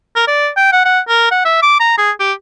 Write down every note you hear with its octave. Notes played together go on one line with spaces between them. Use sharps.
A#4
D5
G5
F#5
F#5
A#4
F#5
E5
D6
A#5
G#4
G4